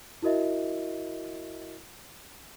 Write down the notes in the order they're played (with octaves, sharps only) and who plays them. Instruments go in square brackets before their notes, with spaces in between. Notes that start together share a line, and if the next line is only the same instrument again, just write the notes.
[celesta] E4 F#4 A#4 D#5 E5